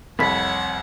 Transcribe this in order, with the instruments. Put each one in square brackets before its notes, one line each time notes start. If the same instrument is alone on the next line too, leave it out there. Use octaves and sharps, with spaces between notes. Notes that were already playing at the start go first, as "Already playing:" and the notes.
[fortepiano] C2 F2 [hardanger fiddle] C#5 F#5 [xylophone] B5 B6